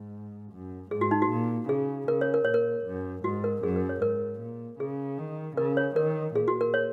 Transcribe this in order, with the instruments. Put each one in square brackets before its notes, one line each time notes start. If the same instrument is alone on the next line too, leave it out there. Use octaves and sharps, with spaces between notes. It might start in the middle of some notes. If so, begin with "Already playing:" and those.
Already playing: [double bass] G#2
F#2
[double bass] G#2 [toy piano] G#4
[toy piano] F#4
D#4
F#4
[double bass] A#2
[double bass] C#3 [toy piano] G#4
[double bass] C#3 [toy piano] A#4
[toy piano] C#5
A#4
[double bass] A#2 [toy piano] C#5
[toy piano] A#4
[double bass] F#2
[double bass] G#2 [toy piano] F#4
[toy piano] A#4
[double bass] F#2 [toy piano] G#4
[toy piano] A#4
C#5
[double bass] G#2 [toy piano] A#4
[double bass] A#2
[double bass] C#3 [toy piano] G#4
[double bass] D#3
[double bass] C#3 [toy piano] A#4
[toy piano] C#5
[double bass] D#3 [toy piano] A#4
[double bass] A#2 [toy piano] G#4
[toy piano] F#4
A#4
C#5